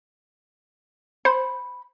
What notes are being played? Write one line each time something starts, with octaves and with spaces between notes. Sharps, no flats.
C5 B5